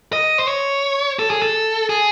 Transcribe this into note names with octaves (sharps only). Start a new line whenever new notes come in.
D#5
C5
C#5
A4
G#4
A4
G#4